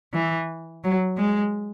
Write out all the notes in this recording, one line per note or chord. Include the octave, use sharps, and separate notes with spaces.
E3
F#3
G#3